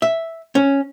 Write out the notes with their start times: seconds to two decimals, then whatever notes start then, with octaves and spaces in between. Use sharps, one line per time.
0.02 E5
0.55 C#4